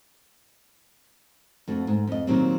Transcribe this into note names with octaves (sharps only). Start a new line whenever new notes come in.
F2 A3 F#4
G#2
F2 D#5
A#2 D#3 F#3 G3 C4